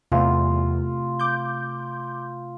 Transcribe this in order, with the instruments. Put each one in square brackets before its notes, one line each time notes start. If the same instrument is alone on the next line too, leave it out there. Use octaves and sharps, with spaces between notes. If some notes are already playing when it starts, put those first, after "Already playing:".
[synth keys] E2 [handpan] C3 A3 [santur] F4
[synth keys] D6 G6